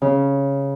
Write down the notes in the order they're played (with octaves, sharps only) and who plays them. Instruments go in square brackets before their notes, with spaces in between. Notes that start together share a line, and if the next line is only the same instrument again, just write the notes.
[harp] C#3